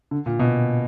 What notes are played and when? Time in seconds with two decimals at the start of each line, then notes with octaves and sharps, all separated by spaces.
0.11 D3
0.26 A#2
0.39 B2